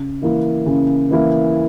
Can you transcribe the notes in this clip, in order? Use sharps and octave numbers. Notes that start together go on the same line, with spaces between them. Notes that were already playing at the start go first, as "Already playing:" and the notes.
Already playing: C#3
E3 A#3 E4
C#3
E3 A#3 E4